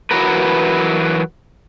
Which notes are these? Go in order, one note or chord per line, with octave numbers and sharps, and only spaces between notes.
E3 F#3 F#4 A#4 B4